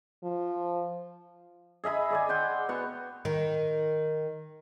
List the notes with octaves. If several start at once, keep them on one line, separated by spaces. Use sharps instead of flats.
F3
G#4 D#5 E5 B5
G#4 D5 G#5
F#5 G5 C6
B3 F#4 C#6
D#3